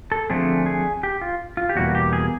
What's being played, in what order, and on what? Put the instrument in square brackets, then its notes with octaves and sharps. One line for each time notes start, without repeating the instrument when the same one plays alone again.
[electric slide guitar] A4
D3 F3 A3 C4 G#4
G#4
G4
F4
F4
G4
E2 B2 G3 A#3 F#4
G4
G#4